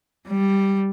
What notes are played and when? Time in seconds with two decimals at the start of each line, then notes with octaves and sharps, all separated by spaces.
0.28 G3